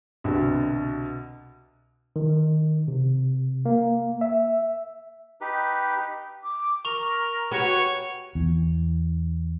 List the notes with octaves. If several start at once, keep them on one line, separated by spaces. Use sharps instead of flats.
C2 B2 D3
D#3
C3
A#3
E5
D#4 G4 B4
D6
A#4 C#6 F7
F#4 G4 B4 C#5
E2